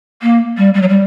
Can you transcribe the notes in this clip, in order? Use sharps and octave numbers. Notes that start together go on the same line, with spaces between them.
A#3
G3
G3
F#3
G3